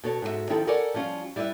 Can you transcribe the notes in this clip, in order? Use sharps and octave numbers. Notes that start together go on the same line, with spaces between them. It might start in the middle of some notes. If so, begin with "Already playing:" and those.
B2 A4 C#5
G#2 F#4 G4 E5
D#3 F3 E4 G4 A4
A4 A#4 C#5 D5 F#5 G#5
F3 G3 C#4 F4
G3 E4 G4 B4 E5